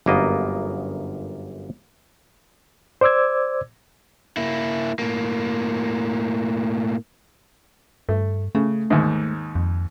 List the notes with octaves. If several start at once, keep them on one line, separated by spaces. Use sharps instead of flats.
G1 F#2 A#3 B3 D#5
C5 D5 D6 E6 G#6
A#3 E4
A2 A#3
G2 A3
C#3 A3
D#2 G#2
F2